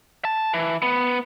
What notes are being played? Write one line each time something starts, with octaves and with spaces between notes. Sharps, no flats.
A5
E3
B3